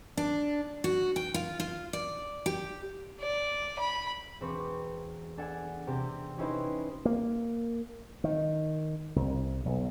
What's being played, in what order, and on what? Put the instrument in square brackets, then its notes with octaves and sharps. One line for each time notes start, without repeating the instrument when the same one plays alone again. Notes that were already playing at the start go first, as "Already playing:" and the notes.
[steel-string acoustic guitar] D4
F#4
G5
F4
F4
D5
G4
[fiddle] D5
B5
[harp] E1 C4 B4 C#6 D6
D4 A4 D5 F#5 G#5
C3 C4 G4 G5
C#4 D#4 E4 G4 B4 C5
[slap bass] A#3
D#3
C2
B1